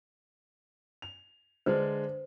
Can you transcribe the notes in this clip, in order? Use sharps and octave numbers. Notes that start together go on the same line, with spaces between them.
F7
D3 G#3 D4 B4 C5